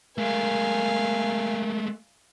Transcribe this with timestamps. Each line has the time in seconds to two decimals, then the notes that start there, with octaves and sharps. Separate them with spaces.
0.18 G#3 A3 A#4 F5 G#5